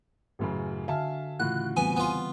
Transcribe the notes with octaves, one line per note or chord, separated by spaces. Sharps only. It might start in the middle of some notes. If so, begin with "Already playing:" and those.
A1 F#2 C#3
D3 F#4 E5 F5 G#5 A5
A2 C#3 E3 F4 F#4 F#6
E3 G3 B3 C4 G#5
B3 F4